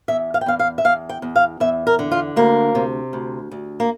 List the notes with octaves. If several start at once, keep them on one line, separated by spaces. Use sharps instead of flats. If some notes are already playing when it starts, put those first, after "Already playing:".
E2 E5
F5
G5
E2 F5
F5
E5
E2 F5
G5
E2
F5
E2 E5
A#4
D3
F4
D2 A#3
C3
D2
D2
A#3